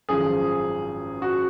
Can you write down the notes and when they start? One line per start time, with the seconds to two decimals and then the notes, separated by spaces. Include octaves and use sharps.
0.09 G#1 F#2 F3 G#4
1.22 F#4